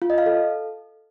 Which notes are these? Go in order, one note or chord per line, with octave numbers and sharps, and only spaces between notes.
F4
D#5
F5
A4